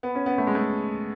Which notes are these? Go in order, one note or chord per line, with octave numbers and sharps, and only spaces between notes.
B3
C#4
B3
A3
G#3
A3